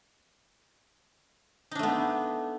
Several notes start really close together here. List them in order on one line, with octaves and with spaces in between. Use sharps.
D#4 D4 A3 B3